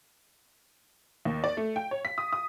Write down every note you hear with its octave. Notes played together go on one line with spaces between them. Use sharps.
D#2
D5
A3
G5
C#5
B6
D#6
D#6